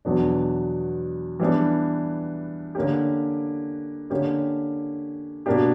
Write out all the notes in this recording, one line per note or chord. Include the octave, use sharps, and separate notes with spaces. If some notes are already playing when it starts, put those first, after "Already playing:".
E2 B2 F#3 B3 D4
E3 G3 B3 D4
D3 A#3 C#4 G4
D3 A#3 C#4 G4
B2 A#3 D4 G4